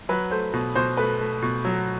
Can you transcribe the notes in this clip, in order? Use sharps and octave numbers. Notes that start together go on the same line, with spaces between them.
F#3 B4
A3 C5
B2
B2 C5
A3 B4
A3
B2
F#3